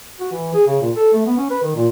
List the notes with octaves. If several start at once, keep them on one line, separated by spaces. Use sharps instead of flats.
F#4
E3
G#4
C#3
A#2
A4
A3
B3
C#4
B4
D#3
A#2